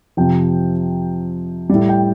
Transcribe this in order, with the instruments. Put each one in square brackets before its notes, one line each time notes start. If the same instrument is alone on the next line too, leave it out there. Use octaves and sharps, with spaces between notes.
[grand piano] F2 C3 F3 G5
A2 G3
G5